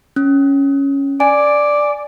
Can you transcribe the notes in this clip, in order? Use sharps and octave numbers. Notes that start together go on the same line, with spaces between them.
C#4
D5 G#5